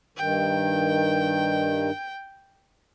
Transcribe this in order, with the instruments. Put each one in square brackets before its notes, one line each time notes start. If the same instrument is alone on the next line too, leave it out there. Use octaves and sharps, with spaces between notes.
[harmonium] G2 D#3 [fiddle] G5